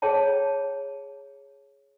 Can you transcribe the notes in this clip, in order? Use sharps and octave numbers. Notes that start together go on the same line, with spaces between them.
G#4 C#5 G5 A5